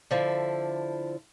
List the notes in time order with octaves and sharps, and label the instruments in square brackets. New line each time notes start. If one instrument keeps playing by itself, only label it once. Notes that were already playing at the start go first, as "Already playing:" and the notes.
[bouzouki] D3 F3 E4